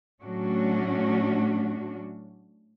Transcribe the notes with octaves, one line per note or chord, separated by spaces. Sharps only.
A2 F#3 A3 C#4 D4 F#4